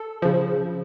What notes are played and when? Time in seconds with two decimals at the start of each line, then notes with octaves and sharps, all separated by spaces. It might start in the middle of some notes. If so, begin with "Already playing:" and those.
Already playing: A4
0.22 C#3 F3